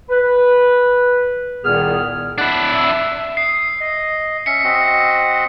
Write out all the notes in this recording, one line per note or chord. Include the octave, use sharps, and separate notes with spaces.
B4
C2 A#2 D#3 B3 G#4 F6
D4 E4 F#5
E5
D#6 C7
D#5
C#4 E5 B6 C#7
C4 F#4 D#5